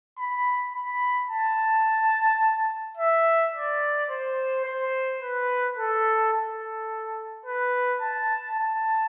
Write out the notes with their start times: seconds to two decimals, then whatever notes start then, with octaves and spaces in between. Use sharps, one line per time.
0.18 B5
0.74 B5
1.30 A5
2.97 E5
3.54 D5
4.10 C5
4.65 C5
5.21 B4
5.77 A4
6.33 A4
7.45 B4
8.01 A5
8.57 A5